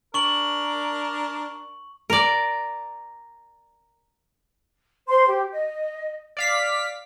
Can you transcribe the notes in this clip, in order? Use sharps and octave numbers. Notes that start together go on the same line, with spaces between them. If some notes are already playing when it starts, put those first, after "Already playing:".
D4 A#4 C#6 F#7
A#4 D5
C5 C6
G4
D#5
D5 F5 B6